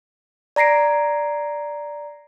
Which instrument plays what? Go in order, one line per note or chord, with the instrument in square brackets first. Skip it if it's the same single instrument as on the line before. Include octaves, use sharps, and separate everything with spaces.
[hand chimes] D5 A#5 A#6 C7 D7